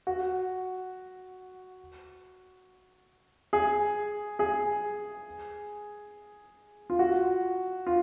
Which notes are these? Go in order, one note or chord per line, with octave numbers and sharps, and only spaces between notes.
F#4
G#4
G#4
F4
F#4
F4